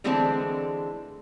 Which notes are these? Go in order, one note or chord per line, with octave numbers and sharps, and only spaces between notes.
D3 E3 G#3 A3 C4 D4